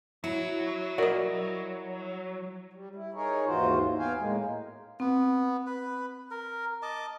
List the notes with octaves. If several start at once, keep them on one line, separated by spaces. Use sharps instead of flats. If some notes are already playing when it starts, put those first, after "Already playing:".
F#3 E4
F#4 A#4 D5 D#5
G3
E4
D#4 G#4 A#4 C#5
D#2 G#2 E3 F4 F#4 C5
B3 F5 G5 G#5
A2 G#3 A#3
B3 C4
B4
A#4
D#5 A5 D6